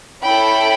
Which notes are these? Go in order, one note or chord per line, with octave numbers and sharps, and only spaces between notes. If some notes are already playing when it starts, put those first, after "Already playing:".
C#4 E4 A4 G5 B5